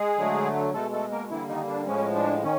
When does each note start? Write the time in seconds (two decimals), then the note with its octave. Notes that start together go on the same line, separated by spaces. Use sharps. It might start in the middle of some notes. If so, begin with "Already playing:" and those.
Already playing: G#3 G#4
0.17 D3 F#3 A3
0.74 B2 G#3 A3 A4
0.92 A3 A4
1.11 A#3 A#4
1.30 D3 E3 G3 A#3 E4
1.49 D#3 D#4
1.68 D4
1.87 A2 F3 G#3 C#4
2.15 D4
2.43 D#3 C#4